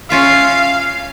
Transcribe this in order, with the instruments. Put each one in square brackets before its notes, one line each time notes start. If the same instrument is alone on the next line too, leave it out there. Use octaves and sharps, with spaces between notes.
[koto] C#4 F4 E5 [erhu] F5